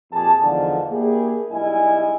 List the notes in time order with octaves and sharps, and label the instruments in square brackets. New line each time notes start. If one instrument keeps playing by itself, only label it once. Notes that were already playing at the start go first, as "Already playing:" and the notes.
[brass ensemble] F2 A#2 G4 G#4 A5
E2 G#2 D3 F3
A#3 D4 E4 G4 G#4
B1 G3 G#3 E4 D#5 G#5